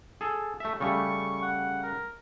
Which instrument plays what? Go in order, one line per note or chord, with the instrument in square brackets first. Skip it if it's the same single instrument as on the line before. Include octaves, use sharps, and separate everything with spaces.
[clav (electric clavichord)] G#4 A4
A3 E5
[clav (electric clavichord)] C#3 G3 A3 [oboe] C#6
[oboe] F#5
A#4